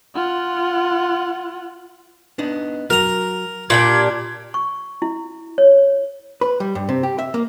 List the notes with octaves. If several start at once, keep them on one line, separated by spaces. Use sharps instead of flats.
F4 F#5
B3 D4 D#4
F#3 F#4 A#4 A#5
A#2 D4 F4 G4 B5 G#6
C#6
E4
C#5
B4
G3
G2
C3
G4
E5
A#3